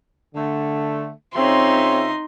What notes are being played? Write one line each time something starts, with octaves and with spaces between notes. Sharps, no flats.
D3 A3
C#3 C4 D#4 F4 C#5 E5 C6